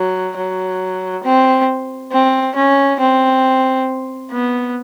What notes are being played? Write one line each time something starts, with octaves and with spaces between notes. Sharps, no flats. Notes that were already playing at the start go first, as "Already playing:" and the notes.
Already playing: F#3
F#3
C4
C4
C#4
C4
B3